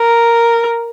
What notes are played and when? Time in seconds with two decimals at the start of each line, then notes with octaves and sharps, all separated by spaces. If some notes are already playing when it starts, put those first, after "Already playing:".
Already playing: A#4